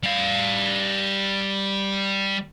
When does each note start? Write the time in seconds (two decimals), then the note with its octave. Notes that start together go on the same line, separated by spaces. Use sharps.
0.03 G3 F5